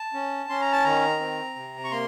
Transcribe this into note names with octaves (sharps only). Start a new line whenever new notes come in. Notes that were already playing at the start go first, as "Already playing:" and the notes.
Already playing: A5
C#4
C#4 C6
A#5
A5
D#3 A#5
C4
C3
C#6
A#3 C6